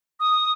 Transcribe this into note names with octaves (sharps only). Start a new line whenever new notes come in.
D#6